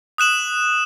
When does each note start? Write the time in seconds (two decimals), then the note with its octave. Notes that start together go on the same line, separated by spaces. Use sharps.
0.18 D#6 F#6 E7 F#7